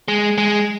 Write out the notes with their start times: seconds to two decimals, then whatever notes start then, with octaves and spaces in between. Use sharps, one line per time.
0.08 G#3
0.38 G#3